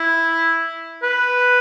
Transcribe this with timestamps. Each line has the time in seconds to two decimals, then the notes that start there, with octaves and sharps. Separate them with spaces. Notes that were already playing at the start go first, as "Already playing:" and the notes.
Already playing: E4
1.03 B4